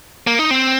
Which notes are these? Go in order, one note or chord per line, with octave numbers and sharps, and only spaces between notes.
A#3
D#4
C4